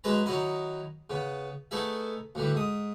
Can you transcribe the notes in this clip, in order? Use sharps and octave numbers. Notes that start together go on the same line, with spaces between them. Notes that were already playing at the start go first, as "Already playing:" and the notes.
F#2 G#3 B4 A5 A#5
D#3 F#3 D#4 E4 D#5
C#3 B3
A3 B3 D#4 G#4 E5
D2 A2 E3 G3
G#2 D#6